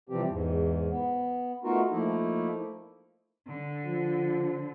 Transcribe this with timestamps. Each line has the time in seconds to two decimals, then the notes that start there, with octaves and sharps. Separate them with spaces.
0.09 C3 E3 F3 G3 C4 G4
0.29 E2 G#2
0.90 B3
1.64 A3 B3 D#4 F4 F#4 A#4
1.91 F3 A3 A#3 D#4 E4
3.47 D3
3.85 F3